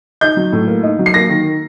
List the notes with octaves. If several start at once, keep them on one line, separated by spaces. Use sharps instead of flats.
D#4 G6
F#3
A2
A#3
D#4
F#3
C7
A#3 A#6
D#3